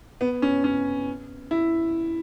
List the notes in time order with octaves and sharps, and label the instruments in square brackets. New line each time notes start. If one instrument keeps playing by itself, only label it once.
[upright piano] B3
C#4
C#4
E4